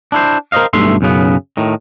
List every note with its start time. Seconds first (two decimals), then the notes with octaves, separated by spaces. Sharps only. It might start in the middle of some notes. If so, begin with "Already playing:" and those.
0.12 D4 E4 C5
0.52 A#4 C5 C#5 D#5 F5
0.73 B1 G2 A3 E5 C6
1.01 B1 F#2 C#3 B3
1.57 A2 D#3